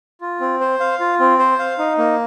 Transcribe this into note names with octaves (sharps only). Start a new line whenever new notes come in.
F4
C4
C5
F5
F4
C4
C5
F5
D#4
A#3